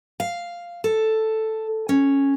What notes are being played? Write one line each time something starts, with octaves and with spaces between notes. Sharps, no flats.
F5
A4
C#4